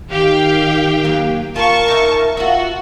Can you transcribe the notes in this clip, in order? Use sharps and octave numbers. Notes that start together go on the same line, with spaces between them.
D#3 G4 F5 G5
D#2 F#3 A#3
F4 A#4 A5 C#6
D#4 E5
F4 F#4 E5